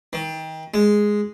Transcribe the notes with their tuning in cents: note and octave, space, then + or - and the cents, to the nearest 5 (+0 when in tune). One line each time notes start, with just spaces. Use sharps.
D#3 +30
G#3 +0